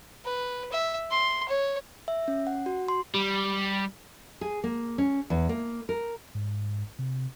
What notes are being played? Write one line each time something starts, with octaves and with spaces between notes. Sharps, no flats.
B4
E5
C6
C#5
E5
C#4
F#5
F#4
C6
G3
G#4
A#3
C#4
E2
A#3
A#4
G#2
C3